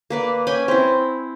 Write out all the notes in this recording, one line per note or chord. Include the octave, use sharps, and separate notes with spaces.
A#3 B4 D5
C#4 G5 G#5 B5
C4 E4